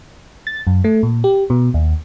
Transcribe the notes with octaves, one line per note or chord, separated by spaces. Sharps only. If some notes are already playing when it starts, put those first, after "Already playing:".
A6
F#2
A3
A#2
G4
B2
D#2